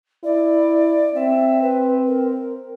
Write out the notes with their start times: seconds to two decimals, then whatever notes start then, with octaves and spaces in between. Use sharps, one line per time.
0.24 E4 D5
1.15 C4 E5
1.62 B4
2.07 A#4